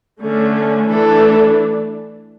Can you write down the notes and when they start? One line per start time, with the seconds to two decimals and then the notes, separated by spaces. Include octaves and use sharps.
0.23 D3 A3 C#4
0.90 E3 A3 D4 A4